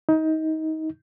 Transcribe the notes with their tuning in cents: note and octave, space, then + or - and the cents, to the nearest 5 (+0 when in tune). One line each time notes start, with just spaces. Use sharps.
D#4 +25